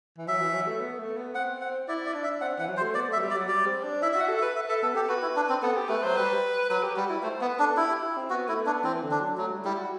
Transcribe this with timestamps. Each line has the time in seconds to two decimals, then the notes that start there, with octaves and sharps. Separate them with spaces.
0.18 E3
0.27 F#3 E5
0.41 E3
0.54 F#3
0.67 A3
0.80 B3
0.99 A3
1.17 B3
1.35 C4 F#5
1.61 F#5
1.88 E4 D5
2.06 D5
2.14 D4
2.23 E5
2.41 C4 F#5
2.59 E3 F#5
2.68 F#3
2.77 C5
2.82 A3
2.94 B3 D5
3.09 A3 E5
3.17 F#3
3.22 G3
3.31 D5
3.35 F#3
3.48 G3 D5
3.66 C4
3.84 D4
4.02 E4 E5
4.13 E5
4.16 F#4 F#5
4.28 A4
4.37 E5
4.42 B4
4.55 E5
4.68 A4 E5
4.82 B3 A4
4.95 G4 A4
5.09 F#4 B4
5.22 E4
5.36 D4
5.49 C4
5.62 B3 A4
5.76 G4
5.89 A3 B4
6.03 F#3 C5
6.17 G3 B4
6.70 F#3 B4
6.83 G4
6.96 G3 F#4
7.10 E4
7.23 A3 C5
7.41 B3 B4
7.59 D4 A4
7.77 E4 G4
7.91 G4
8.03 E4
8.17 C4
8.30 B3 F#4
8.48 A3 E4
8.66 B3 D4
8.84 E3 C4
9.02 D3
9.11 D4
9.20 F#3
9.38 F#3 A3
9.50 G3
9.65 G3 E4
9.78 F#4